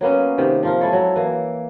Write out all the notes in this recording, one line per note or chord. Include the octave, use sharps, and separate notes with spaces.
F#3 A#3 B3 C#4
C3 D#3
F3 F4 A#4
G#3 E4 A4 C#5
F#3
E3 A#3